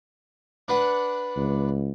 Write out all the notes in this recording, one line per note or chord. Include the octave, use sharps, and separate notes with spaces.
D4 B4 F#5
C#2